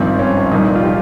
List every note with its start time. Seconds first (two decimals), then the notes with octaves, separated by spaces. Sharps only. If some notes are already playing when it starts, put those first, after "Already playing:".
Already playing: G#1 G2 F3 C4
0.19 C#4
0.51 C2 A#2 F3 D#4
0.68 D#4
0.76 F4
0.83 G4